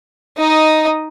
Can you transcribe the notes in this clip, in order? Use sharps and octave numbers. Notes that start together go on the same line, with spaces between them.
D#4 D#5